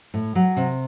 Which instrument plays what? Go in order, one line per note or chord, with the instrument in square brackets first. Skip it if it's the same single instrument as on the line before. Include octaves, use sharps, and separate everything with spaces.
[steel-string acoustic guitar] A2
F#3
C3